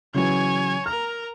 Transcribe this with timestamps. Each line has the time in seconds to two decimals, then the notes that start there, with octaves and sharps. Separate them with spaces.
0.14 C#3 E3 F#3 C#5 G#5
0.86 A#4 A#5 F6